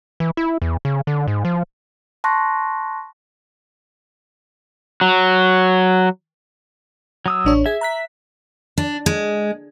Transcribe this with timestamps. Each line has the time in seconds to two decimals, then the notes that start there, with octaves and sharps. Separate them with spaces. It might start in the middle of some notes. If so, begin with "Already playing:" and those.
0.20 E3
0.37 E4
0.62 E2
0.85 C#3
1.07 D3
1.28 G#2
1.45 F3
2.24 A5 C6 C#6 F#6 A#6
5.01 F#3
7.26 F#3 D#6 E6
7.45 A1 D4 C#5
7.66 G#4 E5 G#6
7.81 A#5 F#6 B6
8.78 D4
9.06 G#3